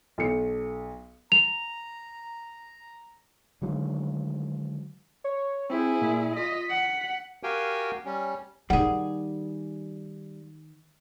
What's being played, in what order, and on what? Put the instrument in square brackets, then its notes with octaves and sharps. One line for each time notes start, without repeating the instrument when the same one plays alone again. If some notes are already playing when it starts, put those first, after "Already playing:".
[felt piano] B1 C#7
[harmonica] A#5 [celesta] F7
[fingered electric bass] D3 D#3 F#3 G#3
[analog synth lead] C#5
[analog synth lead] C4 [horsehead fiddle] E4 G#4
[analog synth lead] A#2
[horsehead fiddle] F4 D#5 [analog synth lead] B6
[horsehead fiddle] F#5
[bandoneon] F#4 G4 A#4 F5 G5 G#5
G3 C#4
[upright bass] D#3 D#4 [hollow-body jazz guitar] G3 G#4 [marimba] F#5